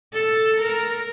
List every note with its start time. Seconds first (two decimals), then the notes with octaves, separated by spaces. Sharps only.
0.13 A4
0.61 A#4